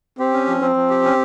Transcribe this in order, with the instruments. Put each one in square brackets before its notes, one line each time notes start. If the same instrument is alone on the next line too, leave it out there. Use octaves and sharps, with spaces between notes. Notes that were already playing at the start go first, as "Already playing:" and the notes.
[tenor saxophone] C4 [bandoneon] G4
[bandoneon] C#4
F3
[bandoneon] F3 [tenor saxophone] C4
[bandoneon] F3
G4
C#4